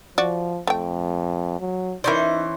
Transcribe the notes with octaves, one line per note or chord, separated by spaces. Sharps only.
F3 F#4 D5
F2 A3 G5
F#3
E3 C#4 D#4 A#4 C5 D5